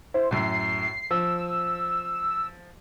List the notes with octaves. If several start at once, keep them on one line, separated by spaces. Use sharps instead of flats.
E4 C5
F#2 A2 C7
F3 E6